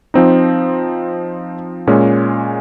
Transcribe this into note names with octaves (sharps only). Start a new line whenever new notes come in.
F3 C4 D#4
A#2 G#3 C#4